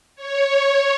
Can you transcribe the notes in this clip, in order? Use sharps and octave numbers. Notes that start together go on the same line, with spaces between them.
C#5